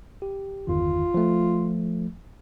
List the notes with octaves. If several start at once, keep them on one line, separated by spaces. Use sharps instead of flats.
G4
G1 E2 D#3 F4
F3 A3